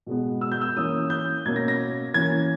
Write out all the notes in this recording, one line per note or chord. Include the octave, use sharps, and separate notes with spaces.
B2 G#3 B3
E6
G6
E6
E3 A#3 C#4 D#6
G6
B2 A#3 C#4 G#6
A#6
A#6
E3 A#3 C#4 G#6